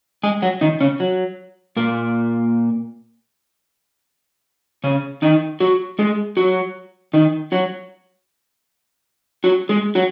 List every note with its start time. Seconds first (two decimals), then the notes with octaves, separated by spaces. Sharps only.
0.23 G#3 G#4
0.42 F#3 F#4
0.61 D#3 D#4
0.81 C#3 C#4
1.00 F#3
1.77 A#2 A#3
4.84 C#3 C#4
5.22 D#3 D#4
5.60 F#3 F#4
5.99 G#3 G#4
6.37 F#3 F#4
7.13 D#3 D#4
7.52 F#3 F#4
9.44 F#3 F#4
9.69 G#3 G#4
9.95 F#3 F#4